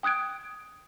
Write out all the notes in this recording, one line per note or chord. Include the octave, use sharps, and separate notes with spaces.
G5 D#6 F#6 G#6 D7